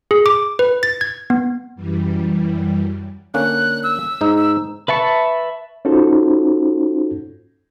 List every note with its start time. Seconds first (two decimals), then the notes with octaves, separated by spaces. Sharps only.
0.11 G#4
0.26 D6
0.59 B4
0.83 A6
1.01 G#6
1.30 B3
1.75 F#2 E3 G3
3.34 D3 A#3 C#4 F#6
3.83 E6
4.21 G#2 D#4
4.37 E6
4.88 B4 E5 A5 C#6
5.85 C#4 D#4 F4 F#4 A4 C5